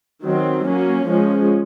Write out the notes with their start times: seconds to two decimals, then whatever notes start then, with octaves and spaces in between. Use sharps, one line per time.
0.23 D#3 F#3 C4
0.64 F#3 A#3 C#4
1.05 F3 G#3 C#4